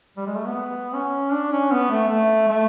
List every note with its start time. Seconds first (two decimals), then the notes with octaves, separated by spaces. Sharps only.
0.17 G3
0.26 G#3
0.36 A3
0.46 B3
0.94 C#4
1.33 D4
1.52 C#4
1.72 B3
1.91 A3
2.09 A3
2.49 A3